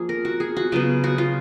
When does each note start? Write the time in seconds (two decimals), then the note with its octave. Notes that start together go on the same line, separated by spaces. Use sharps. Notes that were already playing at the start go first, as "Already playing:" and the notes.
Already playing: F3 A#3 F4 G#4
0.09 A#4
0.25 F#4
0.40 G#4
0.57 F#4
0.72 C#3 F#3 B3 F4
1.04 F#4
1.18 F4